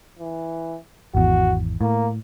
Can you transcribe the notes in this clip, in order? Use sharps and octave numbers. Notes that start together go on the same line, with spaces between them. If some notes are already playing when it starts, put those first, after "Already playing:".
E3
G#1 E2 F#4
A2 A#3